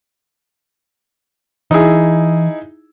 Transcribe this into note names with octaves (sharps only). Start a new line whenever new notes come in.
E3 D#4 E4 G#4